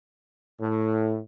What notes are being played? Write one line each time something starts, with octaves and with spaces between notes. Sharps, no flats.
A2